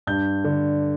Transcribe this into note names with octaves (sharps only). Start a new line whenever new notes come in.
G2 G6
D3